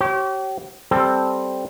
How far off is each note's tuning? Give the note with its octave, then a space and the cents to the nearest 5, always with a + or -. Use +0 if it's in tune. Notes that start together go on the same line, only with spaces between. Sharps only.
G4 -40 C#5 -25
G3 +0 C4 +0 A4 +0